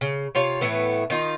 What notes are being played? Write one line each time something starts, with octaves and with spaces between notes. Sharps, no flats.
C#3
C3 F4 C#5
A2 E3 A3 B3
D#3 D#4 F4